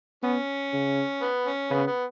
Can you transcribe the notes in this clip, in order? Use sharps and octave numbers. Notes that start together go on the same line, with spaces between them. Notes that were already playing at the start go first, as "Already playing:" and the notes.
B3 C#4
C#3
B3
C#4
C#3 B3
B3